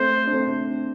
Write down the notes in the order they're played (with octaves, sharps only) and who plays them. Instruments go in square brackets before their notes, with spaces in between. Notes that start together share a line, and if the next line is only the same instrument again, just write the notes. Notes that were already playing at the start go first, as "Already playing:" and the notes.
Already playing: [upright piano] A3 C4 [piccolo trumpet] C5
[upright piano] D4
A3 C4